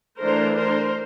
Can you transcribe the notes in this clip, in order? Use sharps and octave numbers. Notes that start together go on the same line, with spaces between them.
E3 A3 D4 A#4 C5
A#4 C5